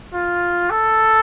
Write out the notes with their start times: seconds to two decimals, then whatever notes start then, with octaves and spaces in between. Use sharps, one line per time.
0.14 F4
0.70 A4